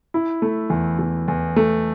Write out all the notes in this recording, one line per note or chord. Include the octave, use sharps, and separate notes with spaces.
E4
A3
E2
E2
E2
A3